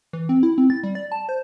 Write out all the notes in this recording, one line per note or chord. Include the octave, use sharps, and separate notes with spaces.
E3
C4
E4
C4
A6
G3
D5
A5
C5